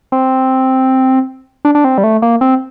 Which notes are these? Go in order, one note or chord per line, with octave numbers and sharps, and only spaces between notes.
C4
D4
D4
C4
G3
A3
A#3
C4